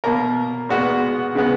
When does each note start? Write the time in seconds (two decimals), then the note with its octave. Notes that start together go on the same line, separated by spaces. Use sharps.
0.04 B2 A#3 A#4
0.69 A#2 G#3 B3 F#4
1.35 C#3 G#3 B3